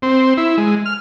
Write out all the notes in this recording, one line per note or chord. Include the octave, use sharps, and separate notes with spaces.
C4
E4
G#3
F6